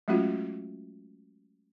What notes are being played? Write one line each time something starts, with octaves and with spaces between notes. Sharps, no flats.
F#3 G#3 A3 C#4 F4 F#4